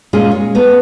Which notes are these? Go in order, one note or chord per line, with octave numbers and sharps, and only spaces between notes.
A#2 G#3 C#4 F4 G#4
C#5
A3 B3